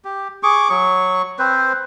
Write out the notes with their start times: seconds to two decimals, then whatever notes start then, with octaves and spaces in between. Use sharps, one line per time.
0.05 G4
0.43 G#4 C#6 D6
0.69 F#3 C#6
1.39 C4 B4 C5